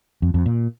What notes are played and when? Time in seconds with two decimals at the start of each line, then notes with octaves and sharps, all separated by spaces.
0.22 F2
0.34 F2
0.46 A#2